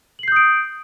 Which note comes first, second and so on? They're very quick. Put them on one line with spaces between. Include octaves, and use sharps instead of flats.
F#7 C7 G6 D#6 D7